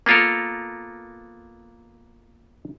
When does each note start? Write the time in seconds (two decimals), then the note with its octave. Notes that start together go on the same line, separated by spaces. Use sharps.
0.06 A#3 B3 F4 A4 A#4